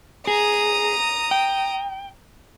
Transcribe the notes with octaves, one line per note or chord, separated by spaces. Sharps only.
G#4 A#5 D#6
G5